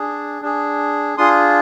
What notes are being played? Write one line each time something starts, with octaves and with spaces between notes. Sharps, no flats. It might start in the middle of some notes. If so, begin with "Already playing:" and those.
Already playing: D4 G#4
D4 G#4
D4 F4 G#4 C6 D#6